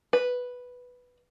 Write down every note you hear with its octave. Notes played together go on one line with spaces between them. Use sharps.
B4